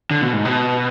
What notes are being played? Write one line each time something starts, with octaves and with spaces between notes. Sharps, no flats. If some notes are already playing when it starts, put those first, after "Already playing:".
D3
B2
G#2
B2